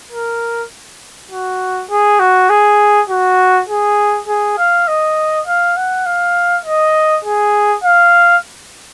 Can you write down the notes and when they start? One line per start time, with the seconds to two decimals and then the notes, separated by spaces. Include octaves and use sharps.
0.12 A#4
1.31 F#4
1.90 G#4
2.20 F#4
2.49 G#4
3.10 F#4
3.69 G#4
4.27 G#4
4.58 F5
4.88 D#5
5.47 F5
5.77 F#5
6.06 F5
6.65 D#5
7.24 G#4
7.84 F5